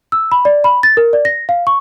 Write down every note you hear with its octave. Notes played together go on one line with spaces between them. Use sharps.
E6
B5
D5
B5
A6
A#4
D5
A#6
F5
C#6